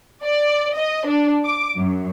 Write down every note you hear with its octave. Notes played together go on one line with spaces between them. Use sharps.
D5
D#5
D4
D6
F#2